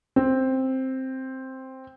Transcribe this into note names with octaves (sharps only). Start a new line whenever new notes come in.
C4